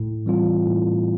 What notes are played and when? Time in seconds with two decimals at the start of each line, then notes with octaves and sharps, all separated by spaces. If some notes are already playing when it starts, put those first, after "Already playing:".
Already playing: A2
0.26 E3 G3 C4 F4
0.67 A2